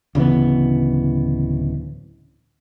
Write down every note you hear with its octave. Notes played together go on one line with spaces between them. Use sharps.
D1 C#3 E3 B3